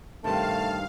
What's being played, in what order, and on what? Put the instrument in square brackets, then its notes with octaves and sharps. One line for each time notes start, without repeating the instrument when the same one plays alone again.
[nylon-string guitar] G2 C3 D#3 [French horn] A3 [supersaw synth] F5 [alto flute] A5